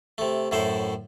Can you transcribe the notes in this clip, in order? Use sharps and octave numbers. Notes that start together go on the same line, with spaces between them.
C3 A3
F#2 A2 E4 A4 C5